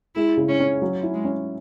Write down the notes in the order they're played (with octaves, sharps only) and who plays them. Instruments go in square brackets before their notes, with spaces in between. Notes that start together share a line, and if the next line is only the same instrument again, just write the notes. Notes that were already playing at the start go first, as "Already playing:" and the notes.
[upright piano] G#3 [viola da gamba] E4
[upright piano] C#3
[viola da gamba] C#4
[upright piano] C#4
F#3
E4
[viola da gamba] G#3
[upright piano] C#4